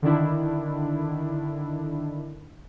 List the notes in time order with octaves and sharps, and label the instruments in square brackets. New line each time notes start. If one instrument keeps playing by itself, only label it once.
[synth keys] D3 D#3 D4 E4